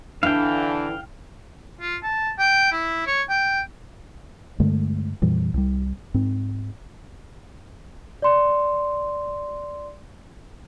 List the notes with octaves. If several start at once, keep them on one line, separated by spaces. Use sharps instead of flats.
D3 E3 D4 E4 F5 G5
F4
A5
G5
E4
C#5
G5
G2 D3 G#3 A3
F2 A#2 E3 G3
C2 G3
G#2 C4
D5 C6